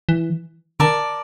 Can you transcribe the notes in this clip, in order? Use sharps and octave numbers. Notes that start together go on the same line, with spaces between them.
E3
D3 A#4 D5 A5